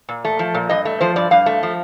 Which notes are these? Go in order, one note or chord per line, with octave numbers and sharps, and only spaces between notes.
A#2
A3
F3
A#2
G2 D#5
A3
F3 C5
G2 D5
G2 F5
A3
F3